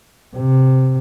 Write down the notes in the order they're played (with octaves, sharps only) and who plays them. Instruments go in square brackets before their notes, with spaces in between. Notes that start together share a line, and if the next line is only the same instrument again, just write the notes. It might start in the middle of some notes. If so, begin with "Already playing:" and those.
[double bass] C3